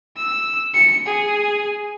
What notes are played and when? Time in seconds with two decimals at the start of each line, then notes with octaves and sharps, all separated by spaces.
0.17 E6
0.74 C#7
1.06 G#4